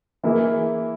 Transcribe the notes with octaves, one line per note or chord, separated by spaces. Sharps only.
E3 A#3 E4 G#4